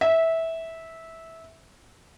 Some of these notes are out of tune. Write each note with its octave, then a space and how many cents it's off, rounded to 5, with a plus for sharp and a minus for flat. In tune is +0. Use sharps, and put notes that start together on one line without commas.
E5 -15